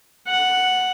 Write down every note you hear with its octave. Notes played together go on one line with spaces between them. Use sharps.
F#5